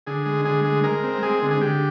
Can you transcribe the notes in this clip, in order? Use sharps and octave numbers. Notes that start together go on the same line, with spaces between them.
D3 G#4
G#3
D3 G#4
G#3
G#3 A#4
C4
G#3 G#4
D3
G#4
D3 G4